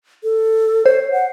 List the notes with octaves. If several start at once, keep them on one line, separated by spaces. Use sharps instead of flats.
A4
C5 C#5
F#5